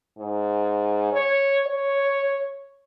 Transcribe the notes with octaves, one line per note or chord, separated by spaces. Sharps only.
G#2
C#5
C#5